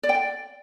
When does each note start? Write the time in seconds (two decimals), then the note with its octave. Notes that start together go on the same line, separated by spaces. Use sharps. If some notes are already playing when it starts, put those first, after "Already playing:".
0.03 D5
0.09 G5
0.15 D5